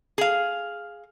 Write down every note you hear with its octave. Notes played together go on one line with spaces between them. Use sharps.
G#4 F5